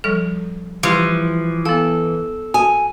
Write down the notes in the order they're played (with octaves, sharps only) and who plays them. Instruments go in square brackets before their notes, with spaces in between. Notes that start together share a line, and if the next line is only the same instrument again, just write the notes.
[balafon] F3 G3 A4
[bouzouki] E3 [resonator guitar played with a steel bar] F3 [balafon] G3 G4 C6
[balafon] B3 F5 [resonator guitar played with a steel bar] A4
[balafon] F#4 [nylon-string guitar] G#5